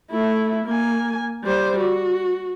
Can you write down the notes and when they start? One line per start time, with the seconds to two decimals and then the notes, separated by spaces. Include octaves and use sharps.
0.11 A3 E4
0.65 A#3 G#5
1.44 G3 C5
1.79 F#4